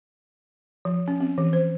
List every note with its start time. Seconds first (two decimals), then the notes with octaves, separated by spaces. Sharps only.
0.85 F3
1.08 C#4
1.20 C4
1.38 E3
1.53 C5